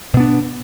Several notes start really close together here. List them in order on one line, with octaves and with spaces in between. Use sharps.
B2 B3 D4